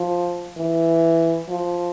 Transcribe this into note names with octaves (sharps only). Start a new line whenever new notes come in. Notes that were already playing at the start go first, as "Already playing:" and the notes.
Already playing: F3
E3
F3